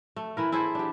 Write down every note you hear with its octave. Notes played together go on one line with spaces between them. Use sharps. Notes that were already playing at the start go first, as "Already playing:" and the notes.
A3
E3 E4 A#4
E4 G#4 A4 C5
D4 G4